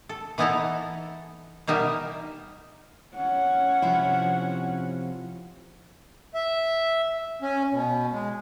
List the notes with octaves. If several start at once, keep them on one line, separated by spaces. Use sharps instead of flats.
A4
E3 B3 D#4 E4 A4 A#5
B2 G3 D#4 A#4 E5 G#5
C#4 F#5
C3 F3 E4
E5
C#4
B2
G#3